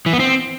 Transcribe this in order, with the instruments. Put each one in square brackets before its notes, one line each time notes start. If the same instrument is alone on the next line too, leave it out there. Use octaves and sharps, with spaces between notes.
[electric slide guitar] E3
B3
C4